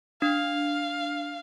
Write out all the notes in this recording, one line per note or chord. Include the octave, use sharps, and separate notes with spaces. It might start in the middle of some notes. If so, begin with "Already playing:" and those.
D4 F5